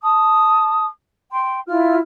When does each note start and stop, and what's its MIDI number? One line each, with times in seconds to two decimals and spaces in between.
0.03 0.86 81
0.03 0.86 87
1.30 1.60 79
1.30 1.60 84
1.67 1.98 64
1.67 1.98 65
1.67 1.98 89